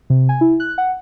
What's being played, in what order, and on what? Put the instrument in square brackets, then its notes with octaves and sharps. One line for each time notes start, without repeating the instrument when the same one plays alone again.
[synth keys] C3
G#5
E4
F#6
F#5